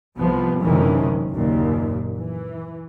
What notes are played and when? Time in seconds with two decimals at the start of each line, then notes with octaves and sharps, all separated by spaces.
0.16 C2 C3 F3 B3
0.61 F#1 D2 C3 D#3 E3 C#4
1.32 F#1 D#2 A#2
2.16 E3